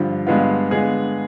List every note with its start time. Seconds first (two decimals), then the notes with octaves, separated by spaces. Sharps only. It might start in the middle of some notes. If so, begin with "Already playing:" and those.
Already playing: G2 D3 F3
0.27 G2 D3 G#3 B3 F4
0.71 D3 G#3 B3 F4 G#4